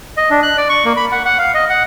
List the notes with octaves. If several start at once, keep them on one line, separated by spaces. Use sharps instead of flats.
D#5
D4
F#6
D5
C#6
A#3
B5
F#5
F#5
F5
D#5
F#5